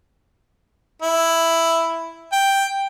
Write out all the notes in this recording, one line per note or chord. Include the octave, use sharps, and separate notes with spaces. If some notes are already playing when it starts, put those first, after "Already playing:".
E4
G5